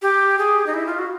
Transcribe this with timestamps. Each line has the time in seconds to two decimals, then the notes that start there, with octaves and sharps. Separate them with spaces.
0.02 G4
0.38 G#4
0.66 D#4
0.74 E4
0.86 F4
0.98 F#4